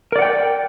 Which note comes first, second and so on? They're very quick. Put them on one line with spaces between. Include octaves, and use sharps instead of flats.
A#4 D5 F#5 G5